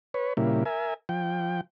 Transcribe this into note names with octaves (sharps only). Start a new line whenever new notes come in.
B4 C#5
A#2 C#3 G3 A#3 E4
A#4 E5 G#5
F3 G5